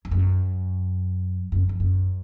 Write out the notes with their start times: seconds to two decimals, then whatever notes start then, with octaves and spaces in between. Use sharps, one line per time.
0.05 F2
0.11 F#2
1.52 F#2
1.69 F2
1.80 F#2